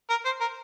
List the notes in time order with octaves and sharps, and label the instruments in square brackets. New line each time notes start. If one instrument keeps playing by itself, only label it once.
[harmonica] A#4
C5
A#4